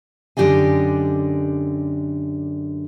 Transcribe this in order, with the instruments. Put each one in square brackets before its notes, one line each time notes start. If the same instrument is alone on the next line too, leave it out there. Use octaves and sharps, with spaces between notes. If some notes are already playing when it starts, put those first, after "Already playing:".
[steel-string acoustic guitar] F#2 D3 G4 D5 D#5 G#5